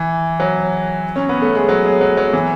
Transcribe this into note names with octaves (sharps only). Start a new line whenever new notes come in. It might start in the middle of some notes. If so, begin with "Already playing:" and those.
Already playing: E3
F#3
C#4
B3
A3
G#3
F#3
G#3
F#3
F#3
E3